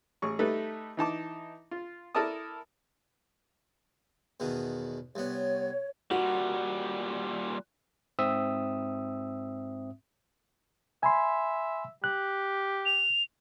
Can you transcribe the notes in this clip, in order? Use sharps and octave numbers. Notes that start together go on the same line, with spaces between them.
A1 G#4 C#6
G3 A3 D#4 A4 B4
E3 D#4 A5 D6
F4
E4 A4 A#4 D5 A5 D#6
E2 B2 D#3
C2 B3 C#5
A#2 G3 F#4
G#2 C4 E5 D#6 E6
E5 G#5 B5 C6
G4 F#6
F7